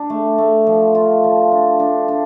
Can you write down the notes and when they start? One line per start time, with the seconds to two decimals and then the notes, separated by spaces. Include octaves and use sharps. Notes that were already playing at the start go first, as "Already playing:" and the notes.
Already playing: D4
0.10 A3
0.38 A3
0.67 F3
0.95 F4
1.24 F3
1.52 D4
1.80 D4
2.08 D4